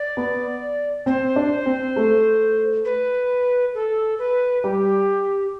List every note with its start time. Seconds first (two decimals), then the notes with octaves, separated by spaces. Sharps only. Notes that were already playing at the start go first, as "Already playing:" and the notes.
Already playing: D5
0.17 B3
1.06 C4 C5
1.36 D4
1.66 C4
1.96 A3
2.85 B4
3.74 A4
4.19 B4
4.63 G3 G4